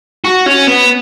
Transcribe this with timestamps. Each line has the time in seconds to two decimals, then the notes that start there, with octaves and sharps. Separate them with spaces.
0.24 F#4
0.46 C#4
0.67 B3